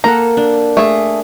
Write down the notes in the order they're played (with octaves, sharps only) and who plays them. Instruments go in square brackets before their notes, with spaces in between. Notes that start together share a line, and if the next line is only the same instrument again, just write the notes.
[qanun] A#3 A4 F#5 [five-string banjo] A#5
[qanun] D4
[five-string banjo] A3 G#4